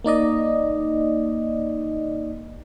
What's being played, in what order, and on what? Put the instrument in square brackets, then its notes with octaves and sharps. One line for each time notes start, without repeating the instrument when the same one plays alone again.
[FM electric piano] A#3 D#4 D5 D#5